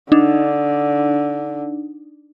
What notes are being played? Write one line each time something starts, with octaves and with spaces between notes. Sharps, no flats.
D3 D4 D#4